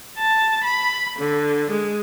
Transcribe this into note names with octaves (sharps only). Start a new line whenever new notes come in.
A5
B5
D3
G#3